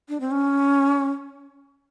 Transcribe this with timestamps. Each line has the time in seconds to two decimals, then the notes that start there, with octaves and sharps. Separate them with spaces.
0.09 D4
0.20 C4
0.31 C#4